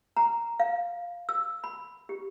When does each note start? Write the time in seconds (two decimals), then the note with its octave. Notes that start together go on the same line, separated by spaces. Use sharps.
0.17 A#5
0.60 F5
1.29 E6
1.64 B5
2.09 G4